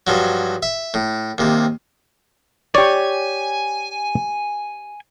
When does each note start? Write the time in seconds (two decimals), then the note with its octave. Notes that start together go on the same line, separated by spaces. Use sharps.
0.07 G2 F3 F#3
0.63 E5
0.94 A2
1.38 D#2 C3
2.75 G4 C#5 D5 G#5